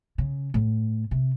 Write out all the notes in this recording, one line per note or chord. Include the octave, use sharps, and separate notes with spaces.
C#3
A2
C3